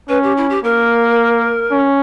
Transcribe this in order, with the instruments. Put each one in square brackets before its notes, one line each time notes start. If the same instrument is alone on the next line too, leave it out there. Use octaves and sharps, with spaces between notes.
[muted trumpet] C#4 [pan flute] B4
[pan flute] G4
E4
G4
[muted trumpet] A#3 [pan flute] A#4
[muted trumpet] C#4